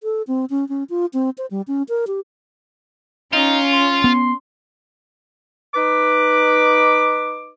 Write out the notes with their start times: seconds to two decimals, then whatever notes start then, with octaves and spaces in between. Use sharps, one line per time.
0.03 A4
0.27 C4
0.50 C#4
0.69 C#4
0.90 F4
1.13 C4
1.38 C5
1.51 G3
1.68 C#4
1.89 A#4
2.07 G4
3.33 C#4 D#4 F4
3.73 C6
4.04 B3
5.75 D#4 B4 D6